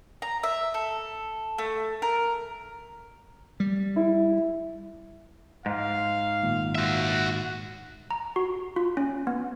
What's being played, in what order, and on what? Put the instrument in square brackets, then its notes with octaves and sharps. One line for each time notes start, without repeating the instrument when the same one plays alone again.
[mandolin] A#5
E5
A4
A3
A#4
[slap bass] G3
[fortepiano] E4
[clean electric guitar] G#2 [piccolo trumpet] F5
[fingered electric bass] G#1 A#2
[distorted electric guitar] F#4 E5
[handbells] A#5
F#4
F4
C#4
B3